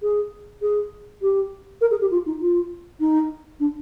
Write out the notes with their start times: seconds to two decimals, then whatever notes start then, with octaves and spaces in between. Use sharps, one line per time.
0.03 G#4
0.62 G#4
1.22 G4
1.81 A#4
1.91 G#4
2.01 G4
2.11 F4
2.26 D#4
2.41 F4
3.00 D#4
3.60 D4